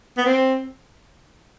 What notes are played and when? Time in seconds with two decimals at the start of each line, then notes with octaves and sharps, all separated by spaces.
0.18 B3
0.26 C4